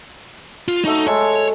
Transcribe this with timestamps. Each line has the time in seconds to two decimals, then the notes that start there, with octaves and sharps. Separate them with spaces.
0.68 F4
0.85 F#3 A3 D#4 E5
1.07 G#3 A4 C#5